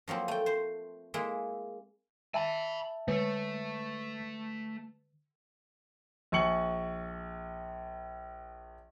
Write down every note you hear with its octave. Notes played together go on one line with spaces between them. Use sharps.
F3 F#3 A#3 C4
A3 G5
C5
G#3 A#3 E4
E5 G#5 A5 B5
D3 A3 A4
A#1 G#5 C#6 C#7 F#7